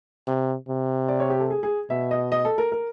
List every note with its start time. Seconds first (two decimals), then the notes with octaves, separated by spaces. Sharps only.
0.27 C3
0.68 C3
1.08 D5
1.20 C#5
1.30 G4
1.40 A4
1.50 G#4
1.63 G#4
1.90 B2 E5
2.11 D#5
2.32 D#5
2.45 A4
2.58 A#4
2.72 A#4